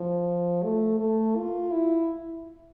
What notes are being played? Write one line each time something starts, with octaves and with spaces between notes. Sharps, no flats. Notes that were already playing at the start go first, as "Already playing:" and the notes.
Already playing: F3
A3
A3
F4
E4